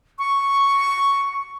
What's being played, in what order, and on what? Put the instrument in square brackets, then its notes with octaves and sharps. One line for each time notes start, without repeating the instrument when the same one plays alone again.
[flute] C#6